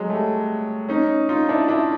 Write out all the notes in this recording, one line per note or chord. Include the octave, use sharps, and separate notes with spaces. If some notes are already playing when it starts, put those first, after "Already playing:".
Already playing: F#3 G#3
G3 A3
C#4 D#4
D#4 F4
D4 E4
D4 E4